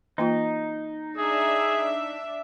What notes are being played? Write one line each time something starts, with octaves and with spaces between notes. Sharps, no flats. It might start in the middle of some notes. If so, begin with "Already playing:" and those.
E3 A#3 D#4 F4
D4 G#4 E5